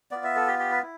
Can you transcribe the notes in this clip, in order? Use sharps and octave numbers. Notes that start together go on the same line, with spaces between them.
B3 F4 D5
E5
A4
G4
G4
B4
E4